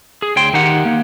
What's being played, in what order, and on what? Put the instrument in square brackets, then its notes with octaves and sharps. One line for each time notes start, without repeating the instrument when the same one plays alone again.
[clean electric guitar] G#4
D2 C#5 G5 C6
D#3 D#4 G4 F#5
A#3